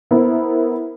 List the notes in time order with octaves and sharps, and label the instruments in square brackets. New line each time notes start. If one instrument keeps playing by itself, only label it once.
[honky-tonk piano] B3 E4 A#4 C5